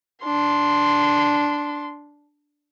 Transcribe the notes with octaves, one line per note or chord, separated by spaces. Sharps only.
D4 C6